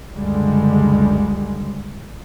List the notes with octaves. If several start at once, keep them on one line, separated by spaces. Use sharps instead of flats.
C#2 F#2 D3 G3 G#3